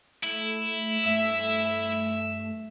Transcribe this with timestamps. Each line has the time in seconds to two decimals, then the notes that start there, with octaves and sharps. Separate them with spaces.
0.24 A3 E4
1.05 G2 A3 E5